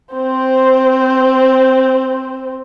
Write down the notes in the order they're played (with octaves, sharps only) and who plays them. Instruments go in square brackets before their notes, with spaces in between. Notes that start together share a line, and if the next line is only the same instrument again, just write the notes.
[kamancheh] C4 C5